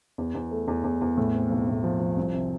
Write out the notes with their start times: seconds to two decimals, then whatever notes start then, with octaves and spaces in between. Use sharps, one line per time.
0.18 E2
0.35 E2
0.51 A3
0.68 E2
0.84 E2
1.01 E2
1.17 A2
1.34 C4
1.50 B1
1.68 A2
1.84 F3
2.00 F3
2.17 C2
2.34 C3